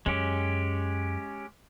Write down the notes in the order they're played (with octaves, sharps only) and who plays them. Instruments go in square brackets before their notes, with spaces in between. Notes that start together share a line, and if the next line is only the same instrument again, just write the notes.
[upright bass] F#2 [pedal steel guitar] G#3 C#4 G4